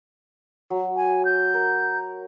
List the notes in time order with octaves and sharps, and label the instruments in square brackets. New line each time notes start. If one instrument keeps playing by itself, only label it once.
[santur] F#3
[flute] G#5
G6
[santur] A#4